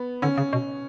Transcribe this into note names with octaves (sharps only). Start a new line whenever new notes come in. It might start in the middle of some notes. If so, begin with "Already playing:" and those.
Already playing: B3
D3 C#4
C#3
B2